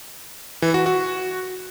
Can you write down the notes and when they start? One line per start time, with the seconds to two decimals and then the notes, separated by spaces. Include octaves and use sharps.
0.62 E3
0.74 F#4
0.86 F#4